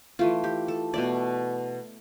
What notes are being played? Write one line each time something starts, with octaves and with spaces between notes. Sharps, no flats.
E3 A3 E4 F4
G4
A4
B2 A3 E4 D5